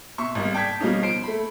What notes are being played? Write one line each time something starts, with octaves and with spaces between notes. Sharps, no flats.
B2 E5 C6 C#6
G#1 G3 A#3
D5 G5 A5 G6 G#6 B6
B2 F3 G3 A#3 C#4 D#4
C5 C7 D7
A3 B5